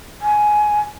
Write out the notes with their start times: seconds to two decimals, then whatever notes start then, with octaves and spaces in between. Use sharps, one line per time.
0.22 G#5